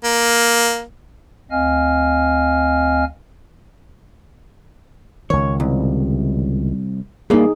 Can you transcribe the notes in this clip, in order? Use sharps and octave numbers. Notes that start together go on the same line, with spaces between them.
A#3
D2 C4 D#5 F5 G#5 F6
C#2 D#3 C#5
C2
G2 A#3 D#4 G#4